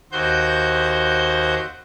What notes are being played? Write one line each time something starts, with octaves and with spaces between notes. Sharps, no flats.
D#2 F#4 C5 G6